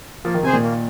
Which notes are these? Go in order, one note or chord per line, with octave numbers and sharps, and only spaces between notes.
F3 A#3
D#3
C3 G#4 C5 G#5
A#2 D#3
A#3